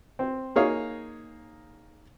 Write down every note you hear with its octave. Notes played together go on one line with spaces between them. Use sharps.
C4
A#3 D#4 G#4 C#5 F5